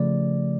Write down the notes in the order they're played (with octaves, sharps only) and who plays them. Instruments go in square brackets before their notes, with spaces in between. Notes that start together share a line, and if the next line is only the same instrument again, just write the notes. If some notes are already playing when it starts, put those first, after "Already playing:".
Already playing: [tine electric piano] C#3 F3 A3 D5